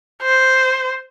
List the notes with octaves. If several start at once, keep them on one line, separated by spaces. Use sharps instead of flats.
C5